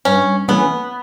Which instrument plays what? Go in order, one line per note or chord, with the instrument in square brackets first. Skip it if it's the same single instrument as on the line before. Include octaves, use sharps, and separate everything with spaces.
[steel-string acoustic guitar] G2 [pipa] C#4
[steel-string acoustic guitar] E3 A3 C#4 [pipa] B3